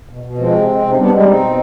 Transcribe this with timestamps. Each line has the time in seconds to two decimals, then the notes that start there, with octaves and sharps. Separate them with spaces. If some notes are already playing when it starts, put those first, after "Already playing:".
0.09 B2
0.23 B2
0.38 F3 G#3 C4
0.53 C3
0.67 G#3
0.82 C3
0.91 D#4
0.97 G3 B3 D4
1.11 G3 G#3 C4
1.26 B2 C4 D#4
1.41 B2